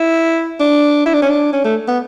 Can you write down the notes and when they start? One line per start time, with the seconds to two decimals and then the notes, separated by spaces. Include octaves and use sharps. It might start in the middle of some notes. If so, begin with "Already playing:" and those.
Already playing: E4
0.60 D4
1.06 E4
1.14 D4
1.22 C#4
1.30 D4
1.53 C#4
1.65 A3
1.88 B3